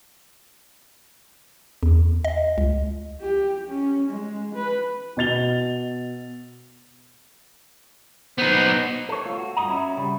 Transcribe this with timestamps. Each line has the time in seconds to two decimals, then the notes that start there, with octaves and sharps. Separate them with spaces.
1.83 E2
2.25 D#5
2.58 C#2
3.21 G4
3.68 C#4
4.10 G#3
4.55 B4
5.17 B2 D#5 A6 F7 G7
8.38 B3 D#4 C5
9.09 A4 C#5
9.25 A3 F4
9.38 F#4
9.57 G2 A#2 D#5 A#5
9.68 C#4 E4 F#4
9.97 C#3 G3